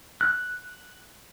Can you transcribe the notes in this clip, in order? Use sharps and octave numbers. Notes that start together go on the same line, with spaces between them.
F#6